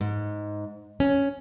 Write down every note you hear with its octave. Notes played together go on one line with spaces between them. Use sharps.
G#2
C#4